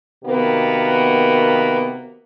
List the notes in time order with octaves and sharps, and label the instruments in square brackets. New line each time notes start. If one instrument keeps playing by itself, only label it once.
[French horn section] C3 D#3 A#3 B3 F#4